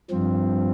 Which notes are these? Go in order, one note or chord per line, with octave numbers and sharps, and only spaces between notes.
G2 F3 C4